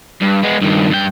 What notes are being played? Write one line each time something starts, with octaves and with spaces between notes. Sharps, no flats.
G2
G#3 B3
G2 D#3
G2 G5